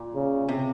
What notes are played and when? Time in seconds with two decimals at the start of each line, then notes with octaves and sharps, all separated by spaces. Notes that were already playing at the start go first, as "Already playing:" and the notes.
Already playing: A#2
0.15 C#3
0.49 C3